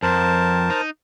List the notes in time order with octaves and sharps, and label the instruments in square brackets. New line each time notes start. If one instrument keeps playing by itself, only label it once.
[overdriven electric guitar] F2 [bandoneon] A#4 C5 A5
[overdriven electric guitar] D#4